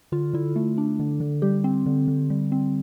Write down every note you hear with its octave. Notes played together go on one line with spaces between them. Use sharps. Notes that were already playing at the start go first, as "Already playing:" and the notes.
D3 F4
D3 E4
A3
D4
D3
D3
G3 G4
C4
D3
D3
G3
C4